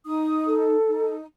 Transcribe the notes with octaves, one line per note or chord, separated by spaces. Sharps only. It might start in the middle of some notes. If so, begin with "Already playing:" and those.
D#4 D#6
A4
D#4